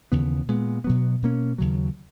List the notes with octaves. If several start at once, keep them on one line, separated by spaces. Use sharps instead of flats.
D#2 C#3 E3 B3
A#2 G#3 B3
B2 F#3 B3
B2 A#3 C#4
D#2 C#3 F#3